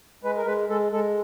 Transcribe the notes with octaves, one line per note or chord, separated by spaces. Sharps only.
G#3 B4
A#4
G#3 B4
G#3 A4
G#3 A4